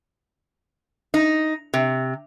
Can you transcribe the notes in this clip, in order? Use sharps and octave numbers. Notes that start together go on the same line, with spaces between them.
D#4
C3